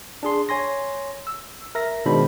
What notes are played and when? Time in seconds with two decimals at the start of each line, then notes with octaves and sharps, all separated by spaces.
0.23 D4 G#4 C6
0.49 C#5 G#5 C6 A#6
1.27 E6
1.75 A#4 E5 A#6
2.06 B2 D#3 G#3 D4 C5 B5